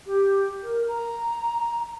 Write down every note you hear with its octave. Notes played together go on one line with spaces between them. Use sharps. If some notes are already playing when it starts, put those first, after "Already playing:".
G4
A#4
A#5